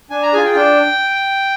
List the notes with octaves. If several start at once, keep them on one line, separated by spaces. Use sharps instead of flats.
D4 G#5
A#5
F4 G#4 G#5
G5
D4 G5